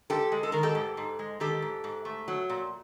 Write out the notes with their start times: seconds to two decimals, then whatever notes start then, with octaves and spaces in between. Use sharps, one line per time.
0.10 G#2 G4 A4
0.32 G#3
0.43 A4
0.52 D#3 A#4
0.63 G4 A4
0.75 G#2
0.97 G#2
1.19 G#3
1.40 D#3 G4 A4
1.62 G#2
1.84 G#2
2.05 A3
2.28 F#3
2.50 A#2